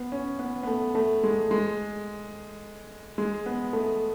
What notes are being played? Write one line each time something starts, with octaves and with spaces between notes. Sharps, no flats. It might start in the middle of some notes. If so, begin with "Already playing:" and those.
Already playing: B3
C#4
B3
B3
A3
A3
G#3
G#3
G#3
B3
A3